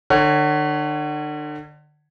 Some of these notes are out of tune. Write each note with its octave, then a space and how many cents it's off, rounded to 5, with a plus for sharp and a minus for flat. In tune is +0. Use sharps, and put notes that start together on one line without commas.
D3 +35 C#5 +0